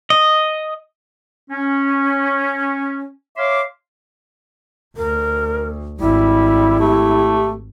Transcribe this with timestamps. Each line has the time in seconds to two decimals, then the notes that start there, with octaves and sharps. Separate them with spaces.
0.10 D#5
1.50 C#4
3.37 C#5 E5 F5 C6 D6
4.97 D2 A#4
6.00 G#1 G3 E4
6.80 A3 G4